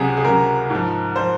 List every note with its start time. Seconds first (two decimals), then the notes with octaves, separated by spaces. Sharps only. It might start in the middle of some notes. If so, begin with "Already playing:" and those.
Already playing: C#2 C3 F#3 G#4
0.17 G#4
0.24 C#2 C3 F#3 A#4
0.70 G#2 F3
1.16 F3 C5